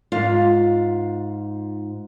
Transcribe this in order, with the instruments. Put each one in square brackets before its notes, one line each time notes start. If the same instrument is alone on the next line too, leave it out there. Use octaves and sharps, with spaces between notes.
[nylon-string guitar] G#2 F4 F5